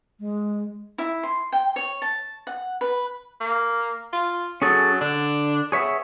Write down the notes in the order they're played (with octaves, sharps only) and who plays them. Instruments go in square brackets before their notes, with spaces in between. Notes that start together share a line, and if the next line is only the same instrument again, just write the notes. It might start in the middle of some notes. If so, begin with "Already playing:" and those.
[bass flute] G#3
[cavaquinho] E4
C6
G5
C#5
A5
F#5
B4
[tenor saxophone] A#3
F4
[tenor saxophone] F#3 [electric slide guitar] C#4 G#4 A4
[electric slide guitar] D3 [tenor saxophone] D4
[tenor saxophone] B3 [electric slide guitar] G#4 C#5 E5